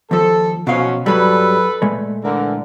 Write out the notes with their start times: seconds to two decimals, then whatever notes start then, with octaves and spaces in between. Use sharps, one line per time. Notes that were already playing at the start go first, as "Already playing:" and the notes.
0.11 D#2 F3 A4
0.67 B2 F3 F#3 C#4 F5
1.06 G2 F#3 G3 A4 B4
1.82 A#2 G#3 A3
2.24 D3 E3 A#4